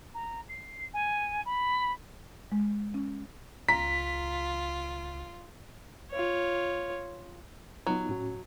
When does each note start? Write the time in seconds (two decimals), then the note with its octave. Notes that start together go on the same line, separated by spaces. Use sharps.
0.14 A#5
0.49 C7
0.93 G#5
1.45 B5
2.52 G#3
2.94 C#4
3.69 C#2 F4 A#5 B6
6.11 F4 C#5
7.87 F#3 B3 D#4 F4
8.09 A2 C#4 F#4